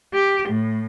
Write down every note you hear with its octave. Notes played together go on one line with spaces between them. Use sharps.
G4
A2